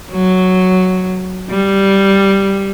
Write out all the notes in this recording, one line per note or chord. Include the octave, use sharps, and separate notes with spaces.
F#3
G3